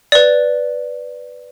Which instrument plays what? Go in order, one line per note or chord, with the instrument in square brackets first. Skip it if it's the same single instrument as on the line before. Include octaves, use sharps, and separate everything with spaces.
[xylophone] B4 D5